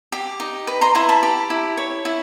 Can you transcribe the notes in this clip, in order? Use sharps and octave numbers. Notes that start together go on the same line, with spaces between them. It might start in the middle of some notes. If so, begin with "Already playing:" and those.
G4
D#4
B4
A#5 C6
E4 A#5 C6
A5 B5
G4
E4
C#5
E4